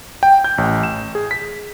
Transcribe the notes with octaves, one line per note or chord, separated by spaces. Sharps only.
G5
G6
A1
E7
G#4
B6